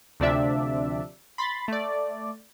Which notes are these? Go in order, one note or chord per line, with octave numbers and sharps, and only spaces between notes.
D2 C3 F3 D4 D5 E5
B5 C6 A6
A3 D5